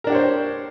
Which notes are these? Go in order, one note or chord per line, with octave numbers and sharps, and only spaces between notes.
D4 G4 A#4 C5 C#5